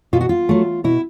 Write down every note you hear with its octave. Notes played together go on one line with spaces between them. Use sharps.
B2 F4
F#4
F4
F#3 A3
B2 E4